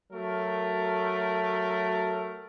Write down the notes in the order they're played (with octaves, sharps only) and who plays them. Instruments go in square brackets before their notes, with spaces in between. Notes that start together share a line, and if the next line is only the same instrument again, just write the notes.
[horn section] F#3 A3 A#4